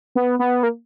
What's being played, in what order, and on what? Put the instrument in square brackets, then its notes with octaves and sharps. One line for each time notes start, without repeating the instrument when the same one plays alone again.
[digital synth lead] B3
B3
A#3